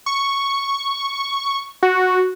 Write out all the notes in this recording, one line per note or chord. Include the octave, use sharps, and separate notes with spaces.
C#6
F#4